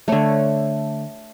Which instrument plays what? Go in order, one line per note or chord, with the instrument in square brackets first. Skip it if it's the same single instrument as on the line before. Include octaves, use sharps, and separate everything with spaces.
[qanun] D3 A3 C#5